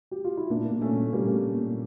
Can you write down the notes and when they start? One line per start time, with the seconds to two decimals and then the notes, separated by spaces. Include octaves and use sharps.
0.11 G4
0.24 F4
0.37 E4
0.50 A#2 A#3 D4
0.71 A#2
0.82 A3 C#4
0.92 A#2
1.13 A#2 G3 A#3
1.34 A#2
1.55 A#2